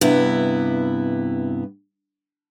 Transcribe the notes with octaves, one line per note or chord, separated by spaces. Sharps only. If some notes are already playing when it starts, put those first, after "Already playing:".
G2 C3 B3 E4